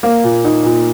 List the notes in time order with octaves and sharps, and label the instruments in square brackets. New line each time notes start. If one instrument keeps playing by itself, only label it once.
[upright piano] A#3
A#2
D#4
A#2